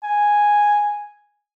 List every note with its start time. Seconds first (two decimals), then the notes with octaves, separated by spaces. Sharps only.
0.03 G#5